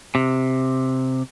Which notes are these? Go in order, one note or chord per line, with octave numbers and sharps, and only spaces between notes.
C3